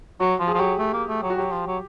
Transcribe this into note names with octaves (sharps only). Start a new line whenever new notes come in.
F#3 F#4
F3
G#4
F3
F#3 G4
A3
A#3
A3
F#3
F#4
F#3 G4
F3
F#3